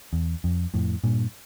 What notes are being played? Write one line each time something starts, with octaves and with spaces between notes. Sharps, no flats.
E2
F2
F2 A2
G2 A#2